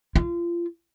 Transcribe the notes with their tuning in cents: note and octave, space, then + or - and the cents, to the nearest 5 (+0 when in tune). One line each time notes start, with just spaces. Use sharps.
F4 -30